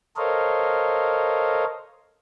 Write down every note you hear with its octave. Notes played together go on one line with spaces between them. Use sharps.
A4 A#4 C5 C#5 D#5 F5